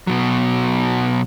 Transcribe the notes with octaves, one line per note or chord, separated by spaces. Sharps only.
B2 F#3